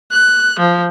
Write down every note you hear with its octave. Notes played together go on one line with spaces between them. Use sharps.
F#6
F3